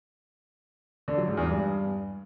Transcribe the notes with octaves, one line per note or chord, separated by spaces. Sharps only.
D3
F#3
G#2
E2
G2